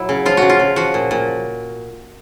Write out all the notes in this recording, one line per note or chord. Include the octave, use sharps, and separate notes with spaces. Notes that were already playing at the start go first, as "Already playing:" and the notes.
Already playing: A#2 F#3 E4
C#3
F3 F4
C#3 F#4
F4
C#3
F3 F#4
A#2
A#2